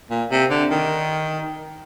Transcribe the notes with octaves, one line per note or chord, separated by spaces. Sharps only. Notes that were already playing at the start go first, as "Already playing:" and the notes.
A#2
C3
D3
D#3